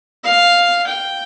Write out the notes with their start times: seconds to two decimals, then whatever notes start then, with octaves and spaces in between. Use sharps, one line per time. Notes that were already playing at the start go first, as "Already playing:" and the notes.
0.24 F5
0.87 G5